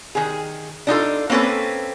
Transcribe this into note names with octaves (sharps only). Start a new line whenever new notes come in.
D#3 G#4
D4 D#4 F4 A4
A#3 C4 C#4 A4 B4